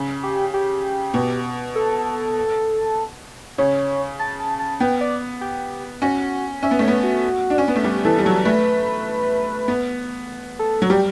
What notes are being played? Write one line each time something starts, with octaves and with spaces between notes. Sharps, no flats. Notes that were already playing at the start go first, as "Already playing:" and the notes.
Already playing: C#3
G4
G4
B2
A4
C#3 C#5
A5
A5
A5
B3 G5
D5
G4
C#4 F#4
C#4 E5
B3
A3
B3 C#5
F#4
D4
C#4
B3
A3
G3 G4
E3 A4
G3
F#3 A4
A3 B4
B3
A4
F#3
G3 G4